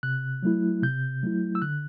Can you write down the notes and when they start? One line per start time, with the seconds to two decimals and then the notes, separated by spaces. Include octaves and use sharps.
0.03 C3 F#6
0.43 F#3 A3 E4
0.83 C3 G6
1.23 F#3 A3 E4
1.55 E6
1.62 D3 F#6